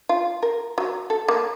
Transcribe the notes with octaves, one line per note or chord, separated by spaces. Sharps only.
F4
A#4
F#3
A4
A#3